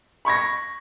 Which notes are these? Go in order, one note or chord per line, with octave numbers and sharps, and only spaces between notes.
B5 C#6 G#6 A#6